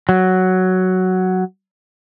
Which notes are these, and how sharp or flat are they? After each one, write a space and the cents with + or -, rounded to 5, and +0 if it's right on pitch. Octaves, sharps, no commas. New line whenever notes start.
F#3 +5